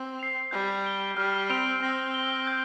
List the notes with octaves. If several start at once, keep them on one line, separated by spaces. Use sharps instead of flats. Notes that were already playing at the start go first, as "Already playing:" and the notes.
Already playing: C4
C7 F7
G3 G6
D7 G7
G3 F6
C4 D7 F7
C4 A#6
G7
G6